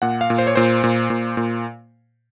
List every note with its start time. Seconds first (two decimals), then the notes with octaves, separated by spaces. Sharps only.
0.02 A#2 F#5
0.21 F5
0.30 A#2
0.38 C5
0.47 C#5
0.55 A#2 C5
0.84 A#2
1.10 A#2
1.37 A#2